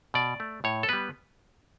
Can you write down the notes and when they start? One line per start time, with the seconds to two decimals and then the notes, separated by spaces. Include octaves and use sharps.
0.14 B2 D5
0.40 A3
0.64 A2 C#5
0.83 A4
0.89 G3 B3 B4